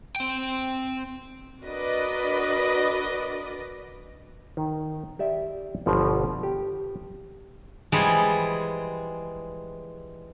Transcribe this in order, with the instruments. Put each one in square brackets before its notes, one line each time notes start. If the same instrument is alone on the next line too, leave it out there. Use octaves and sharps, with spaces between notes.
[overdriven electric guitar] C4 G5
[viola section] D4 F#4 A#4 B4 D5 D#5
[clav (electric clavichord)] D#3
G4 D5 E5
G1 B2 F3 F#5
G4
[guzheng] E3 F3 G3 G#3 G#4